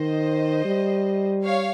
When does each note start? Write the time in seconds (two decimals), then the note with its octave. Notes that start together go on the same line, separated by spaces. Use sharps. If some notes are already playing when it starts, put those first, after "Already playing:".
Already playing: D#3 C5 D#5
0.65 G3
1.43 C#5 F5